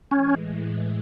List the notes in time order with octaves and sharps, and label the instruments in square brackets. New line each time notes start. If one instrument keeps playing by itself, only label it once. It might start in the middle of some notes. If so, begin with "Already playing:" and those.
[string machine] A2 E3 G#3 [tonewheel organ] C#4